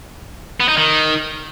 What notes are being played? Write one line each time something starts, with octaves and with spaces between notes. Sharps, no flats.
B3
D#4
D#3